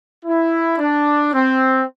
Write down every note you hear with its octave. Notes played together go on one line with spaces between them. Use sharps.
E4
D4
C4